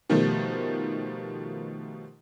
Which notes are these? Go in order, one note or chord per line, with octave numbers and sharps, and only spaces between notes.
B2 D#3 F3 G3 A3